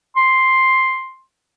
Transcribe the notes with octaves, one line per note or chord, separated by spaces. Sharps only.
C6